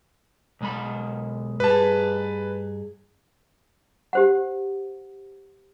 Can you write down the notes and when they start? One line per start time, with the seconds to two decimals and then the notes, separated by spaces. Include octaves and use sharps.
0.61 B1 G#3 B5
1.60 G2 G#4 B4 A5
4.13 G4 C5 F#5